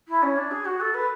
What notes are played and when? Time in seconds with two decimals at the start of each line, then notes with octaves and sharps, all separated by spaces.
0.08 E4
0.22 C#4
0.36 D4
0.51 G#4
0.65 F#4
0.80 A4
0.94 B4